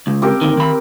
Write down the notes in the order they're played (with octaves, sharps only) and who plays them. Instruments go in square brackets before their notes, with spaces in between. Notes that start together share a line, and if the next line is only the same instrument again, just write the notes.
[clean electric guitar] C#2
[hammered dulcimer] C4 G4 A#4
[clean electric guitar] D2 D#3
D#3 B5